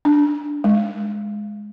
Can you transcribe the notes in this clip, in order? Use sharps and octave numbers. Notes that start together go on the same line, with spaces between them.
D4
G#3